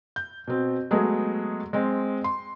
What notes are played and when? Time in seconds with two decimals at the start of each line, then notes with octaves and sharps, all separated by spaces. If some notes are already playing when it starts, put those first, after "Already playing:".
0.16 G6
0.47 B2 C4
0.91 F#3 G#3 A3 B3 G#4
1.73 G#3 C4
2.24 C6